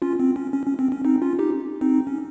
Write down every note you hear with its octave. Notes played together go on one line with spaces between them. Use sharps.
C#4 F4
C4
C#4
C#4
C#4
C4
C#4
C4 D#4
C#4 F4
D#4 G4
C4 D#4
C#4